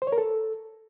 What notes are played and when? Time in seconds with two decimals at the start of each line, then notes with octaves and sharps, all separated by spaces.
0.02 C5
0.07 C#5
0.12 A#4
0.18 A4